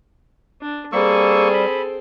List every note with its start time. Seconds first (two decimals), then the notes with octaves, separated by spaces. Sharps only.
0.61 D4
0.93 G3 A#3 C4 G#4 A4 C#6 E6
1.54 B5